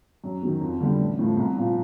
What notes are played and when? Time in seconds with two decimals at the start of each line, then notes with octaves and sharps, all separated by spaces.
0.24 F#2
0.43 D#3 F#3
0.61 F2
0.81 D3 G3
0.99 A1
1.19 A2 F3
1.37 C2
1.57 A#2 F3